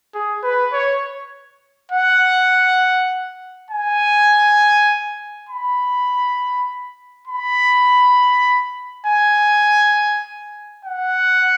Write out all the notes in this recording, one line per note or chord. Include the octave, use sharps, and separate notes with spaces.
G#4
B4
C#5
F#5
G#5
B5
B5
G#5
F#5